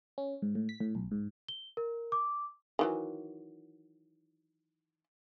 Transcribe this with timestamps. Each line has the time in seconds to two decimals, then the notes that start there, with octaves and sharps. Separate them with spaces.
0.18 C#4
0.42 G#2
0.55 A2
0.69 B6
0.80 A2
0.95 B1
1.11 G#2
1.48 G7
1.77 A#4
2.12 D6
2.79 D#3 E3 F#3